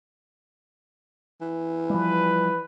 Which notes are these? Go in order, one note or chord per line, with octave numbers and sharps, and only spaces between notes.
E3
F3 G3 B4